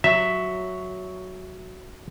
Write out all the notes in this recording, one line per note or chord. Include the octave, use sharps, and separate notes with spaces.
F#3 E5